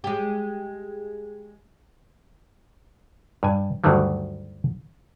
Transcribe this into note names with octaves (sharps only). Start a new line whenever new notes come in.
G#3 G4
G2 G#5
D2 G2 D#3 F#3 G3